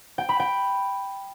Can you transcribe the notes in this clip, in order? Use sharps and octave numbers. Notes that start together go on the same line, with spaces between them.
G5
B5
G5